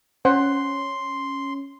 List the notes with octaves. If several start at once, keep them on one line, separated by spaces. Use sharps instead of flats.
C#4 C5 F#5 C6